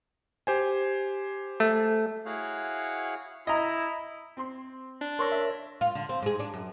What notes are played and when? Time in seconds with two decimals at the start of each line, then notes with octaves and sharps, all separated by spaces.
0.47 G4 C5 G#5
1.60 A3
2.26 E4 F#4 G#4 C#5 F5 F#5
3.47 E4 D#5 A#5
4.37 C4 C6
5.01 D4
5.19 A#4 C#5 C6 C#6 E6 A#6
5.32 E5
5.81 F4
5.95 D3
6.09 C4
6.22 G#2 G#4
6.39 D4
6.54 F#2